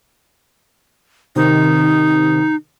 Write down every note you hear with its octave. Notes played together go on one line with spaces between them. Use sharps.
C3 D#3 D#4